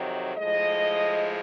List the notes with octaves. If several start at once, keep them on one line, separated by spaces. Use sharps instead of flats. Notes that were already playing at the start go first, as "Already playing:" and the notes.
Already playing: F2 C3 D#3 F#3
A2 F3 G#3 D#5